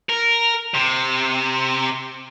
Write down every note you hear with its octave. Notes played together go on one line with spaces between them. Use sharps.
A#4
C3